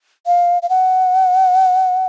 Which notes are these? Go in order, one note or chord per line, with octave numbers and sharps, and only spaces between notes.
F5
F5
F#5